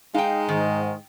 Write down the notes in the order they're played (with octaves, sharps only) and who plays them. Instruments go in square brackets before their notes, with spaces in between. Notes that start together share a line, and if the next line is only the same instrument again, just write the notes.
[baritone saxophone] G#3 [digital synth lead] D#4 [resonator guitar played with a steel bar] F5 G5
[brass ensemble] G#2 [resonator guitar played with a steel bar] D#3